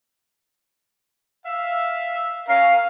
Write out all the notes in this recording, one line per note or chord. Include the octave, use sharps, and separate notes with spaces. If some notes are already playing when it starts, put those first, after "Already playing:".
E5 F5
C#4 A#4 F5